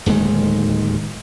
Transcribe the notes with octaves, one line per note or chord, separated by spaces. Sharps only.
D1 D#2 D#3 G#3